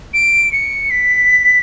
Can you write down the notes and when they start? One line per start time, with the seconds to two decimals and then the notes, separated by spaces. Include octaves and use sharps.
0.14 D7
0.52 C#7
0.91 B6